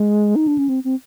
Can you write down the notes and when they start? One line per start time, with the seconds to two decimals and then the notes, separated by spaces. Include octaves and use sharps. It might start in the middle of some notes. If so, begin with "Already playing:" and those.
Already playing: G#3
0.36 D#4
0.47 D4
0.58 C#4
0.69 C4
0.84 C4